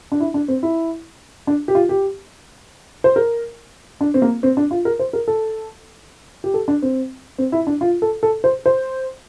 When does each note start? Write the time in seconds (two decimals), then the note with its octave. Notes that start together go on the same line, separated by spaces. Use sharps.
0.12 D4
0.20 E4
0.34 D4
0.48 C4
0.63 E4
1.47 D4
1.68 G4
1.75 F4
1.89 G4
3.04 C5
3.16 A#4
4.01 D4
4.14 C4
4.22 A#3
4.43 C4
4.57 D4
4.71 F4
4.85 A#4
4.99 C5
5.13 A#4
5.28 A4
6.44 G4
6.54 A4
6.68 D4
6.82 C4
7.38 C4
7.52 E4
7.67 D4
7.81 F4
8.02 A4
8.23 A4
8.44 C5
8.66 C5